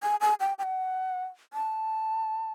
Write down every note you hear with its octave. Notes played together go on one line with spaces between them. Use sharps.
G#5
G#5
G5
G5
F#5
A5